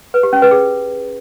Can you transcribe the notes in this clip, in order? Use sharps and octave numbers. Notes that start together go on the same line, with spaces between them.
B4
G4
C#4
B4
G#4